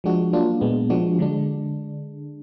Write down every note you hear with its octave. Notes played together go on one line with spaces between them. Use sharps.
F3 G#3 D4 F#4
F#3 A#3 D4 F4
A#2 G#3 B3
F3 G#3 D4 F#4
D3 G#3 D4